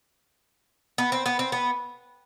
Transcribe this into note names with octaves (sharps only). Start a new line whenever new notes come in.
B3
C4
B3
C4
B3